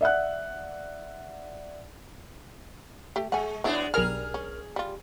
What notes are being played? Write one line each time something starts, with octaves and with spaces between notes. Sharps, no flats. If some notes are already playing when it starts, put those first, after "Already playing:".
D5 E5 F#5 F#6
A3 G4
G#3 F#5 G#5
F#3 G#3 B3 D4 E4 C#5
B1 G3 G#4 A#4 F6
C#4
G3 F4